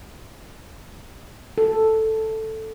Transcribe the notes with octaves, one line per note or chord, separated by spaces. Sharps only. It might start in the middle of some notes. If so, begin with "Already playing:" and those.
A4